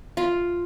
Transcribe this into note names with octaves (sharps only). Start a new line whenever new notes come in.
F4